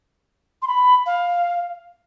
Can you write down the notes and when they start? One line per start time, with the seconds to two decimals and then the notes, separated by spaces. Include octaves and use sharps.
0.62 C6
0.68 B5
1.06 F5